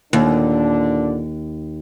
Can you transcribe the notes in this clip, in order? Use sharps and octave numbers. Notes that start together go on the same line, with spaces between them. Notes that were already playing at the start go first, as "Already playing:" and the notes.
D#2 A#2 D3 D4